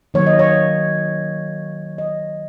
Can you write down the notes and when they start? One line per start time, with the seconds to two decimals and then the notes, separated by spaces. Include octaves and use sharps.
0.14 D#3 F#3 A#3 C#5
0.26 D#5
0.39 C#5
1.98 D#5